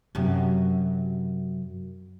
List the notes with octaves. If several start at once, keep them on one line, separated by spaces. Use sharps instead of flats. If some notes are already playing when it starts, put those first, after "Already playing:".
F#2 C3